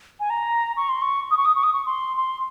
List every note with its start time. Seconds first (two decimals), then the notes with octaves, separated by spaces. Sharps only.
0.20 G#5
0.30 A#5
0.77 C#6
0.89 C6
1.02 C#6
1.31 D#6
1.37 C#6
1.45 D#6
1.55 C#6
1.63 D#6
1.73 C#6
1.86 C6
2.17 C6